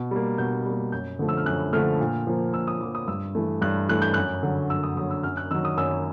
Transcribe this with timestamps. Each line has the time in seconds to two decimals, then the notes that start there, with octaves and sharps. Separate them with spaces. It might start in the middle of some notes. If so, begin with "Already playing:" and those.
Already playing: B2
0.11 G3 A#3
0.38 B2 G6
0.66 G3 A#3
0.92 F#2 G6
1.19 D3 F3 A3
1.28 E6
1.37 F6
1.46 F#2 F#6
1.73 D3 F3 A3 F6
2.00 A#2
2.27 F3 A#3
2.54 A#2 E6
2.67 D#6
2.81 F3 A#3 D6
2.95 D#6
3.08 G2 E6
3.35 E3 A3
3.62 G2 F#6
3.89 E3 A3 F#6
4.02 G6
4.14 F#2 F#6
4.43 D3 F#3
4.70 F#2 E6
4.83 D#6
4.96 D3 F#3 D#6
5.11 E6
5.23 F#2 F6
5.37 F#6
5.51 D#3 F#3 E6
5.65 D#6
5.77 F#2 E6